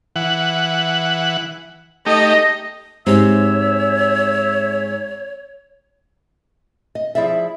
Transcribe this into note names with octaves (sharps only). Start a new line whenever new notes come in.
E3 F#5
A3 D#4 G4 D#5
G#2 C4 G4 C#5 E5
D#5
F3 E4 G#4 D5 E5